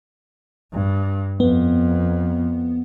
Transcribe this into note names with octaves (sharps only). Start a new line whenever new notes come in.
G2
F2 B3